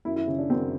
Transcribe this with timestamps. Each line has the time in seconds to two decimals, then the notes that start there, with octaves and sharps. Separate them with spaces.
0.05 F#2 E4
0.16 E4
0.27 C#3
0.39 D4
0.50 F#2 C4